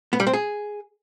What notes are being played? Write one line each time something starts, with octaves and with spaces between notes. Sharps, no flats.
B3
G3
C4
G#4